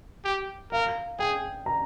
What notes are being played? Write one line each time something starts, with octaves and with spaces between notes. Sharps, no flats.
G4
A#4 F5
G#4 G5
A#5